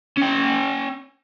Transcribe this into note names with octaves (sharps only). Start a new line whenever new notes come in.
C#4 G5